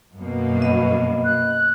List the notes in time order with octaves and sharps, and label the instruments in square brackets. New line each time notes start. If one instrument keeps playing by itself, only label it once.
[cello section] F#2 B2 A#3
[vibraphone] D#5 B5
[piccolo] F#6